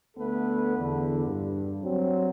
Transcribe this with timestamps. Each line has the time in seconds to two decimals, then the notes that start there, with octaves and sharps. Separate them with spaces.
0.17 D2 A3 B3 D4 A4 B4
0.77 E2 D3
1.26 G2
1.83 F#3 G3 C4